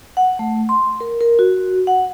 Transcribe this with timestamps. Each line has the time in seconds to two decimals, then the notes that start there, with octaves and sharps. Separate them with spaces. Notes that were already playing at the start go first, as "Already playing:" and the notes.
0.17 F#5
0.39 A3
0.69 C6
1.00 A#4
1.21 A#4
1.39 F#4
1.87 F#5